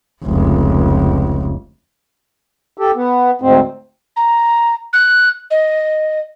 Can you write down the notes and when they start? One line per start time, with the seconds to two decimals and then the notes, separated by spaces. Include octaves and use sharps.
0.24 F1 C#2
2.77 G4 A4
2.95 B3
3.41 D2 G#2 C4
4.16 A#5
4.93 F#6
5.50 D#5